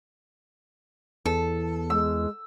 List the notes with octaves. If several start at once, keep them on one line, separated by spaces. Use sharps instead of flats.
E2 A4
G#3 E6